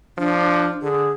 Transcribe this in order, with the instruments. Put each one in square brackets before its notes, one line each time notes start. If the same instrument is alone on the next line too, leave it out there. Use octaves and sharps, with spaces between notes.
[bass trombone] F3 [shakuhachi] D4
[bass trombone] D3 [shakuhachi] G#4